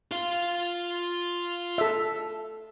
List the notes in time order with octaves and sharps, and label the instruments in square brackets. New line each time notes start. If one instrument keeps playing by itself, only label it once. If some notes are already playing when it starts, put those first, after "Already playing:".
[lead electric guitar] F4 F5
[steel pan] A4 E5